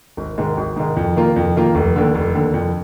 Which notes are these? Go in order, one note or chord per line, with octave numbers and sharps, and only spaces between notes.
G#1
G#2 D#3 G#3
G#1
G#2 D#3 G#3
F2
D#3 A#3 F4
F2
D#3 A#3 F4
F1
D#2 D3
F1
D#2 D3
F2